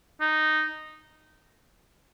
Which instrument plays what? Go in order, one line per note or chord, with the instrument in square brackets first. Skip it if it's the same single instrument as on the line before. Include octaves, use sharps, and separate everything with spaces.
[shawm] D#4